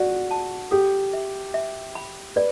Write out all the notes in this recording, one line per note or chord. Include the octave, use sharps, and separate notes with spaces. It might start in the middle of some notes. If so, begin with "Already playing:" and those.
Already playing: F#4 D5
A5
G4 A4
E5
E5
B5
B4 D5